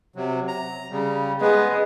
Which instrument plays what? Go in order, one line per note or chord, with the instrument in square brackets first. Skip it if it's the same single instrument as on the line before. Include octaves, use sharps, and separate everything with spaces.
[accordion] C3 F#3
A#5
C#3 G3
[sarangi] G#3 [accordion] B3 B4